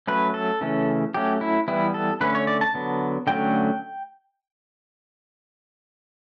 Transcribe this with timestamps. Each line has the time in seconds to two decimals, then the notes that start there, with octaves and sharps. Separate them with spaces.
0.07 F#3 A3 C#4 B4
0.34 A4
0.61 C#3 E3 A3 C#4
1.14 F#3 A3 C#4 G4
1.41 E4
1.68 E3 G3 B3 E4
1.94 A4
2.21 D3 A3 C#4 B4
2.35 C#5
2.47 D5
2.61 A5
2.74 D3 F#3 B3
3.27 D3 F#3 A3 C#4 G5